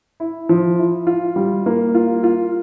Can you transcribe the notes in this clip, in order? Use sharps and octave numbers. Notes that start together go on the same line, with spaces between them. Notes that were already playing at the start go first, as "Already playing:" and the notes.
E4
F3
E4
F4
G3
A#3
F4
F4